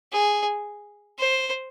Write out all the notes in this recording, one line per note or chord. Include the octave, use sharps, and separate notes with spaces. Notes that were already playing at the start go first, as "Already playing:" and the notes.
G#4
C5